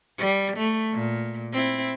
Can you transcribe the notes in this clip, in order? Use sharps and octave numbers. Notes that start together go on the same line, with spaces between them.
G3
A3
A#2
C4 E4